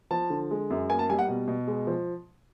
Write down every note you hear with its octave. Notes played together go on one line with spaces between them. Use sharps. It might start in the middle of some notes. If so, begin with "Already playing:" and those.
F3 A5
D3
G#3
F#2
A#3 G#5
A5
G3 G#5
F#5
B2
B2
G#3
F3